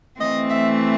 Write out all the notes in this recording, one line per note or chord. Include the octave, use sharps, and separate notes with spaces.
E3 A3 C4 D#5
E5